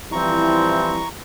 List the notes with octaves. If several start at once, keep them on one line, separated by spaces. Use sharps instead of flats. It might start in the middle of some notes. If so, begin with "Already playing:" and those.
E3 F3 G3 C4 E4 A#5 C#6